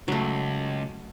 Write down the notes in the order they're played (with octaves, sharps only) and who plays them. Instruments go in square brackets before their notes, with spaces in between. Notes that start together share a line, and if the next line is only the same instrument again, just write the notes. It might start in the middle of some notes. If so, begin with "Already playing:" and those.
[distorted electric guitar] C#2 [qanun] F#3 A3